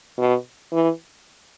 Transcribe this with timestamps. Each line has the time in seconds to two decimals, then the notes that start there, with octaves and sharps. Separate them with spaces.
0.18 B2
0.72 E3